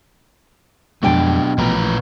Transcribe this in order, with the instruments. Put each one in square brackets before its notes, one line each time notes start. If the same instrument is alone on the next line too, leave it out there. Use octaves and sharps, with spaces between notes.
[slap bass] F2 G#3 [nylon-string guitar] B2 G5 A5 [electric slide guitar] F#3 D4
[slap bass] A1 F3 [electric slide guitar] A#2 B4 A#5